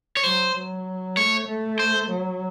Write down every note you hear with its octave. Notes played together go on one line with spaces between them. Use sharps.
C#5
F#3 C5
F#3
A3 C#5
A3
C5
F#3